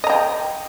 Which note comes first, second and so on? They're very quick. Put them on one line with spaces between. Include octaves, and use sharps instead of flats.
D#5 A#5 G5